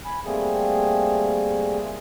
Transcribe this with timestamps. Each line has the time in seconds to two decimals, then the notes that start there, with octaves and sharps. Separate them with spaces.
0.05 G#5 B5
0.25 G3 A3 A#3 C4 G#4